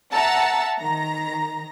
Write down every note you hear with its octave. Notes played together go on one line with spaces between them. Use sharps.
E5 F#5 A5 A#5 E6
D#3 A#5